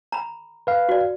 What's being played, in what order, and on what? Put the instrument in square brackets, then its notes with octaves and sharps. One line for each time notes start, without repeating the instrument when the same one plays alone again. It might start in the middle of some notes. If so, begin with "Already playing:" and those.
[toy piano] A#5 B5
[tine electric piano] B4 F5
[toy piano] F#4 D5